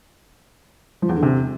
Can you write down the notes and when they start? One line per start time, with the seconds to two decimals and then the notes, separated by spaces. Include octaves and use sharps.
1.02 F3
1.09 E2
1.16 D3
1.23 C3